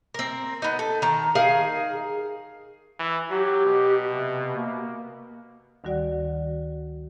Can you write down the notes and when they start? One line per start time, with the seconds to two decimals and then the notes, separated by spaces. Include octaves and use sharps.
0.14 C4 A#4
0.62 B3 D#4
0.79 A4
1.02 D#3 A5 A#5
1.35 D#4 G#4 A#4 F5
2.99 E3
3.30 F#3 G4
3.65 B2
4.10 C3
4.56 A#3
5.84 D2 D#3 G3 F#4 D5 F#5